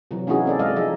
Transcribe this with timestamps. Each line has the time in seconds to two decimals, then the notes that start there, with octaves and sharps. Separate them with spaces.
0.11 C3 E3 F#3
0.27 A#3 C#4 D#4 E4 F#4 G#4
0.46 C4 A4 D5
0.59 G#3 D5 D#5 F5
0.76 F3 D#4 G#4 D#5 E5